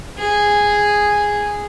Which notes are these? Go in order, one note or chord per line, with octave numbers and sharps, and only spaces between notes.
G#4